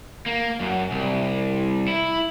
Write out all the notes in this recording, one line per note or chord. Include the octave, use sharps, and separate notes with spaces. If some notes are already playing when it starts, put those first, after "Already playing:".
A#3
F#2
C2
E4